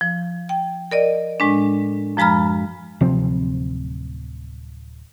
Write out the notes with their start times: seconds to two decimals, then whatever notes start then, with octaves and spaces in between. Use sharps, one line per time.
0.01 F3
0.49 G5
0.91 A#4 D5 D#5
1.40 A2 G#3 D4
2.17 F#2 F3 G#3 A#5 B5 F6
3.01 D1 C3 F3 C4